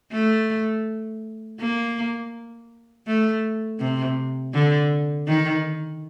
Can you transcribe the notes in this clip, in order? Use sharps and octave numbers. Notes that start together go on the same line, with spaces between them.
A3
A#3
A3
C3
D3
D#3